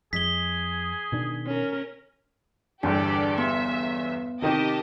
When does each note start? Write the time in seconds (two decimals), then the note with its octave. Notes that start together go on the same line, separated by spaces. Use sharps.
0.13 F2 G#3 G#4 B6 G7
1.12 B2 D#3 D4
1.46 C#4 A#4
2.83 G1 E2 D4 G4 A4 D5
3.38 B3 E5
4.42 C3 D#3 D#4 G4 D#5 A5